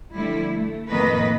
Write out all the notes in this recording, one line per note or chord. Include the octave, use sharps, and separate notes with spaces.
D3 F3 G3 A3 E4
A3
F2 A2 D#3 A#3 B4 D#5